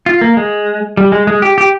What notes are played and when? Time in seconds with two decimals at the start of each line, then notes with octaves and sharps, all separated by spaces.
0.06 F4
0.21 A#3
0.37 G#3
0.97 G3
1.12 G#3
1.27 G#3
1.42 G4
1.58 G4